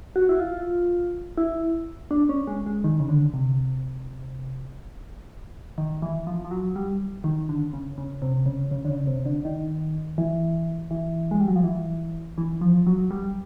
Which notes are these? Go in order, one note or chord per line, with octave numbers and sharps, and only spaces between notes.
F#4
E4
F4
E4
D4
C#4
G#3
G#3
D#3
C#3
D3
C3
D#3
E3
F3
F3
F#3
G3
D#3
D3
C#3
C#3
C3
C#3
C#3
D3
C#3
C3
D3
D#3
E3
E3
G#3
G3
F#3
F3
E3
E3
F3
F#3
G3